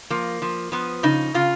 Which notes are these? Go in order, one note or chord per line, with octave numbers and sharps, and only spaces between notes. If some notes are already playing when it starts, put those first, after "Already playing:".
F3 A#3
F3
F3 B3
C#3 D#4
C#3 F4